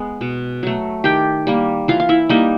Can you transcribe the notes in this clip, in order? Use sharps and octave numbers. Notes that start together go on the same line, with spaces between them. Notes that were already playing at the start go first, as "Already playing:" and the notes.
Already playing: G#3 B3
B2
F#3 A3
D#3 G4 G5
G3 A#3
E3 F4 F5
F5
E4 E5
G3 A#3 D#4 D#5